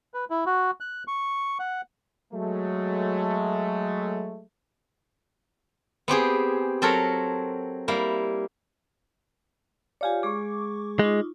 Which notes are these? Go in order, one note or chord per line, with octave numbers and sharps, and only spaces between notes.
B4
E4
F#4
F#6
C#6
F#5
F#3 G#3 A3
B3 C4 G4 G#4
F#3 C4 A4 A#4 C#5
G3 A#3 E4
F4 G4 C#5 D5 F5 G#5
G#3 G#4 C#6 D6
G#3 D#4 F4